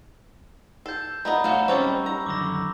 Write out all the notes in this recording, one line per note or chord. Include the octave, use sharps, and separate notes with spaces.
A4 G6 C7
A3 B3 D#5 A#5 B5 G6
A3 F#4 C#5 E5 F5
G3 C4 C#4 D#4 C#5 A5 C#6 E6
A#5
F#2 D3 D#3 D6 E6 A#6